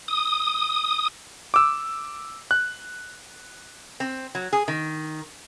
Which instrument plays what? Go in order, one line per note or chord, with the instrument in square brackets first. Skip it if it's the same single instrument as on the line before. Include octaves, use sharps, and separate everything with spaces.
[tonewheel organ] D#6
[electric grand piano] D6 E6
F#6
[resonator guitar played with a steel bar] C4
F#3
G#4
D#3